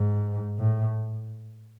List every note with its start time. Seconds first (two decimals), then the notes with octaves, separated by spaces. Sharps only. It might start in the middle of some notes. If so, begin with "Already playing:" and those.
Already playing: G#2
0.59 A2